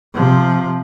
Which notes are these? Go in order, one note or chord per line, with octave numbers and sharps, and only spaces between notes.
C3 F3